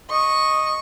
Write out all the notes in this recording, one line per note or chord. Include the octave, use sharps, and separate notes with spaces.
D#5 C#6